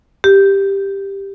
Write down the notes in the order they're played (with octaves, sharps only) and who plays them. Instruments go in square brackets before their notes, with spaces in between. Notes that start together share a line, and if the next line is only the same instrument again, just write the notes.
[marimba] G4